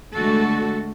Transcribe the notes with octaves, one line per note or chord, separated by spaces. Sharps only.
D3 G#3 A3 F#4 A4